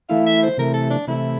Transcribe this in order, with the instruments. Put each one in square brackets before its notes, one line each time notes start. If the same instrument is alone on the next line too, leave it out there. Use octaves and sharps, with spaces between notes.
[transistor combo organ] E3 A3 E4 [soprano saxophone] F5
[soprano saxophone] E5
C5
[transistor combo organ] C3 E3 A3 [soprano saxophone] A#4
[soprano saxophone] A4
D4
[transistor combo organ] C3 E3 A3 [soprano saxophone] E4